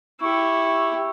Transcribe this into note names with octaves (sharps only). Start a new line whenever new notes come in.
E4 G4 C#6